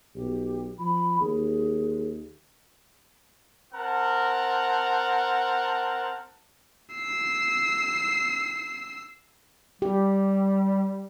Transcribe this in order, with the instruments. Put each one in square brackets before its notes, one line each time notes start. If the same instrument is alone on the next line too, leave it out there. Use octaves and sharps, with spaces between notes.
[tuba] B1 [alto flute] G4
[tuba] F3 [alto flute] B5
[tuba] D#2 [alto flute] G#4
[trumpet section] C4 A#4 F#5 A5
[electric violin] E6 C7
[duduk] G3 [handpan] G4